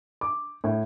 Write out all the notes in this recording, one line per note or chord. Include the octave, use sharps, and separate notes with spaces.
D6
A2